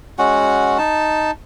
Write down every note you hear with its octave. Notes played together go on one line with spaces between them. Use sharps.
G#3 C#4 F#4 F#5
D#4 A5